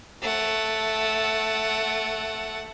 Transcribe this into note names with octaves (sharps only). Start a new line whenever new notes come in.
A3 F#5